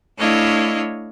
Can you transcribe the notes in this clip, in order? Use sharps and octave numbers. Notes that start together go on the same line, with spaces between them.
A3 D4 E4 C#5 D#5 F5